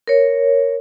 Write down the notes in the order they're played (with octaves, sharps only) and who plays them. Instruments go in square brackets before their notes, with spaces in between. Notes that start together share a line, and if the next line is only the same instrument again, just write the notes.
[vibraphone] A#4 C#5